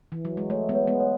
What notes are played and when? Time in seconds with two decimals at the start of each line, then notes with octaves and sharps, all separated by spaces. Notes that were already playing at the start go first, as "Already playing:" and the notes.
0.12 E3
0.25 F#3
0.37 G#3
0.50 A3 C#5
0.69 G#3 B3
0.75 C#5
0.87 G#3 B3
1.00 C#5